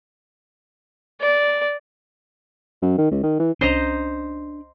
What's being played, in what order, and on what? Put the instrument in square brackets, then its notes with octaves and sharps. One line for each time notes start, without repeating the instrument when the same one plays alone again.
[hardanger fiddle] D5
[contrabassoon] F#2
D#3
C#2
D#3
E3
[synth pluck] C2 C#4 G6 [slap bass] D4 [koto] C5 D#5 A#5